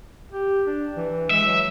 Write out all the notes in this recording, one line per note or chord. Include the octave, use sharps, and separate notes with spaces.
G4
D4
E3
G#3 E5
F#3